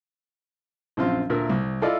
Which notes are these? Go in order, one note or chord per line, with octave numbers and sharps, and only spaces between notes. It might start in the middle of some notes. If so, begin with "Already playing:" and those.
A#1 F#2 C4 F4 C6
D2 A#2 A#4 E5
C2
E4 F4 A4 D5 D#5